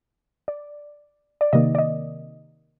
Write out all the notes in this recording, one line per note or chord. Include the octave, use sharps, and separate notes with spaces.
D5
D5
C3 D#3 A#3 D#5
D5
D#5